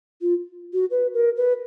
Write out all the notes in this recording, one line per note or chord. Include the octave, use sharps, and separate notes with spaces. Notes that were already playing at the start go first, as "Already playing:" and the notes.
F4
F#4
B4
A#4
B4